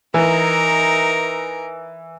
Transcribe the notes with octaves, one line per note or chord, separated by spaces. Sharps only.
E3 D#4 A#4